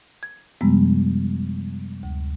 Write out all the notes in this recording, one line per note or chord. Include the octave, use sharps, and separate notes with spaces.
G#6
F#2 C3 F3 G3 G#3 B3
D2